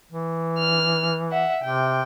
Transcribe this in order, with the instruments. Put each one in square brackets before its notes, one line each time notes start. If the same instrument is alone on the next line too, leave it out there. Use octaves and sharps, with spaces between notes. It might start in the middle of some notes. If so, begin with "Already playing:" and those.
[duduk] E3
[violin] F6
E5 F#5
[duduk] C3 [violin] G5